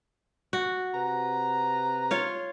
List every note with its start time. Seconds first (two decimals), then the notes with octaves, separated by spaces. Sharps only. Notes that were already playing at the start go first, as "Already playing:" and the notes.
0.53 F#4
0.94 C3 B4 A#5
2.11 F4 C#5 F5